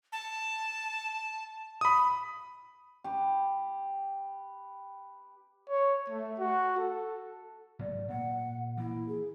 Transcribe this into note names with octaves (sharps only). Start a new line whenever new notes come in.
A5
B5 D#6
G4 B4
C#5
A3
F#4
A4
G#2 F#3 A3 D5
A#2 F#5
E3 A#3 E4
G#4